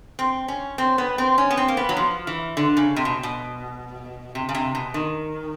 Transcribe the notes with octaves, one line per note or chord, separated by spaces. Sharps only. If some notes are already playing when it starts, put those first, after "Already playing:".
C4
C#4
C4
B3
C4
C#4
B3
C4
A#3
B3
F#3
F3
E3
D3
C#3
C3
B2
B2
C3
C#3
C3
B2
D#3